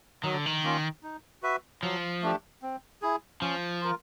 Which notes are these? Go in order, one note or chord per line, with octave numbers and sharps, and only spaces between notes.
D#3 F#3
D3
D#3
A#3 C#4 F4
D#4
F#4 B4 E5
F3 F#3
A3 D4 G4
C4
E4 G#4
F3 C#4
F4 A#4